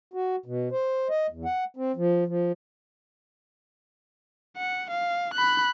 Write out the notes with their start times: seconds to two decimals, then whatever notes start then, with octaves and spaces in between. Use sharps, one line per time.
0.14 F#4
0.46 B2
0.72 C5
1.10 D#5
1.30 E2
1.45 F#5
1.77 C4
1.96 F3
2.27 F3
4.57 F#5
4.91 F5
5.34 B5 F#6